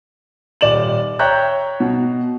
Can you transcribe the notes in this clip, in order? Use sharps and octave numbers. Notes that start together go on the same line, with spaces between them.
D#1 D5 E7 F#7
C#5 E5 G5 A#5 F#6 G6
B2